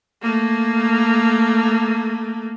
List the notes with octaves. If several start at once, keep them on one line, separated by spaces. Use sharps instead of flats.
A3 A#3